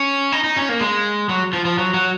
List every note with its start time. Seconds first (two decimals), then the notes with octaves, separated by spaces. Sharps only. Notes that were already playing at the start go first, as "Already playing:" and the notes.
Already playing: C#4
0.32 D#4
0.44 D#4
0.56 C#4
0.69 A#3
0.81 G#3
1.29 F#3
1.53 F3
1.65 F3
1.78 F#3
1.94 F#3